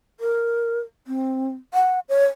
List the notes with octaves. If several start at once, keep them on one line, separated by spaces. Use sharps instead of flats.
A#4
C4
F#5
C#5